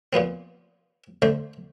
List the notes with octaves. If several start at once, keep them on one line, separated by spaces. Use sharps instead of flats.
A#2 F3 B3 C4
D3 A3 C5